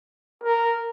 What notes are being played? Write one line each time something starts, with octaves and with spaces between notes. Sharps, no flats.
A#4